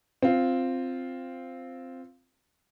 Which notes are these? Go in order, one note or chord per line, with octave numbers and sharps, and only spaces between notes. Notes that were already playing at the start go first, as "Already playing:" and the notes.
C4 F4